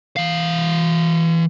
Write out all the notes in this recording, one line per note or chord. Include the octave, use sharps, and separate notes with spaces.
E3 F5